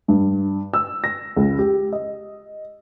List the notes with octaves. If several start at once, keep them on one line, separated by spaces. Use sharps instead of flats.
G2
E6
A#6
C#2
G4
D#5